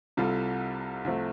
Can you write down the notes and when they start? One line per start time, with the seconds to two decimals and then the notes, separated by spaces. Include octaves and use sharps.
0.17 C2 C3 G3 F4 A4
1.05 C2 C3 F3 A3